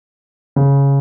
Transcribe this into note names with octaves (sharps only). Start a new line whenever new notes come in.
C#3